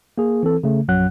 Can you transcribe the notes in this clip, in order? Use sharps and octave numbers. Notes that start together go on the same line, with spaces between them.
A#3 G#4
E3 C4 A4
C#3 A3
A#1 F#2 F#3 F#5 F#6